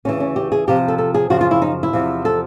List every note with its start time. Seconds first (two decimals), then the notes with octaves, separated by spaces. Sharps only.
0.05 D2 C#3 E3 C#4
0.20 C#4
0.36 G4
0.52 G#4
0.67 E2 C3 F3 G4
0.88 A4
0.98 A4
1.15 G#4
1.30 F#2 C#3 F3 F#4
1.41 F4
1.51 E4
1.62 D#4
1.83 E4
1.93 E2 C3 F3
2.25 A4